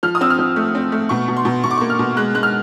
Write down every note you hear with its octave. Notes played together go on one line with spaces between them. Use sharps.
F3 F6
D#6
C4 E6
F6
F3
A3
C4
A3
B2 C#6
B2
C6
B2
B2 C#6
D6
A#3 C#6
F6
B2
G#3 F#6
G#3 F#6
F6